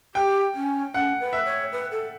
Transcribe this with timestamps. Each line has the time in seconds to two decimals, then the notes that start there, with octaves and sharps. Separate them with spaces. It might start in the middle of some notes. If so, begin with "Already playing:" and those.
0.15 G4 G5
0.55 C#4
0.94 C#4 F#5
1.20 B4
1.33 E5
1.46 C#5
1.72 B4
1.91 A4